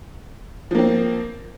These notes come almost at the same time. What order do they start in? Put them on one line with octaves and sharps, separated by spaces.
F3 A#3 C4